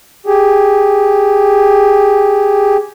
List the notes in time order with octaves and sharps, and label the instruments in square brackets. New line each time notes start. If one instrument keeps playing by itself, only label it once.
[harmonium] G4 G#4